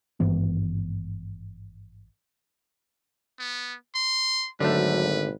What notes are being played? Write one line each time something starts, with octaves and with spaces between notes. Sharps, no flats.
G#1 G2 E3 B3
B3
C6
G#1 D3 F#3 A3 B4